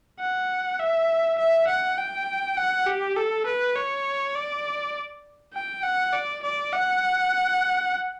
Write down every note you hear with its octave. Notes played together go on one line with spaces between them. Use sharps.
F#5
E5
E5
F#5
G5
F#5
G4
A4
B4
C#5
D5
G5
F#5
D5
D5
F#5